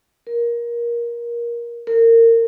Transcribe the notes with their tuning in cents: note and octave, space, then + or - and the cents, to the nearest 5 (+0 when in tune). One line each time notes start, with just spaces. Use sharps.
A#4 +20
A#4 -25